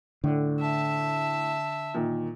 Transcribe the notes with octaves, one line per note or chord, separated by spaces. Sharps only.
A2 D3
E5 A5
A#2 D#3